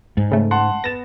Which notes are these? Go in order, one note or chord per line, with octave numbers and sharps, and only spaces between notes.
G#2
C#3 A3
F#5 A5 C6
B3 A6 A#6 E7